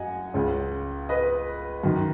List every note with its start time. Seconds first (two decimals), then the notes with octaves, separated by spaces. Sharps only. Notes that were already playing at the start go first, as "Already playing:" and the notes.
Already playing: F#2 D#5 F#5 G#5
0.34 C#2 C#3
1.09 B4 D#5
1.83 F#2 D#3